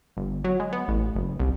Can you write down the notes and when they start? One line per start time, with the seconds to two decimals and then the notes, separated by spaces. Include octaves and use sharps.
0.17 G1
0.44 F#3
0.60 G#3
0.73 B3
0.88 A1
1.15 F#1
1.39 C2